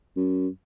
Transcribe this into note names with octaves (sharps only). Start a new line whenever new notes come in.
F#2